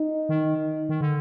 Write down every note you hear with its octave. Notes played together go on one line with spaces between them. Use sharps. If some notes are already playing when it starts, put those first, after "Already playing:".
Already playing: D#4
D#3
D#3
D3